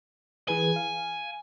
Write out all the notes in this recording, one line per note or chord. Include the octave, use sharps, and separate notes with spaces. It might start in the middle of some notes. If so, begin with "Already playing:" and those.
E3 G#4 B4 G#5
F5